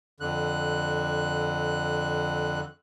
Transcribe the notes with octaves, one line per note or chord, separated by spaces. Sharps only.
F2 D3 F#6